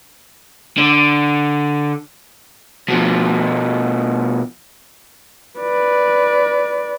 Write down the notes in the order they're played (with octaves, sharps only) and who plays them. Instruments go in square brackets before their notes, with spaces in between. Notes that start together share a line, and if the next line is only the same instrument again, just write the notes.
[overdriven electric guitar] D3
B2 F3
[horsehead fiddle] B4 D5